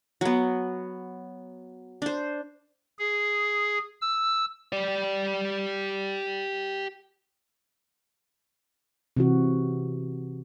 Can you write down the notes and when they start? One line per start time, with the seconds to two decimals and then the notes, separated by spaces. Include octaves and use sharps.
0.21 F#3 B3
2.02 D4 C5
2.99 G#4
4.02 E6
4.73 G4 D5
9.17 C3 E3 F#4